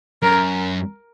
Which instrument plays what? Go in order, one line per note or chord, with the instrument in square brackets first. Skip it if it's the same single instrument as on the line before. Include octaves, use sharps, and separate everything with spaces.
[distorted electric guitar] F#2 [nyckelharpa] A#4